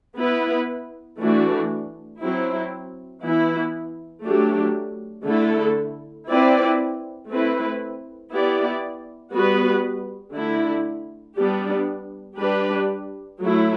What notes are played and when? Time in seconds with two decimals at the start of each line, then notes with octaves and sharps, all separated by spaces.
0.17 B3 E4 B4
1.19 E3 A3 D4 F#4
2.20 F#3 C4 E4
3.22 E3 B3 E4
4.24 F#3 A3 D4 G4
5.25 D3 A3 E4 A4
6.28 C4 E4 B4 D5
7.29 A3 C4 E4 B4
8.31 B3 E4 G4 D5
9.32 G3 B3 F#4 B4
10.34 D3 A3 E4
11.37 G3 B3 D4 G4
12.39 G3 D4 G4 B4
13.39 F#3 A3 E4